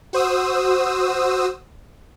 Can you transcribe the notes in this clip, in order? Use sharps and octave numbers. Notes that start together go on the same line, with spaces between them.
F#4 C5 D#6 E6